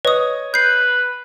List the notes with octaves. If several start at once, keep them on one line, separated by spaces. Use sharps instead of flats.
B4 C#5 D#5 D#6
B4 G6 C7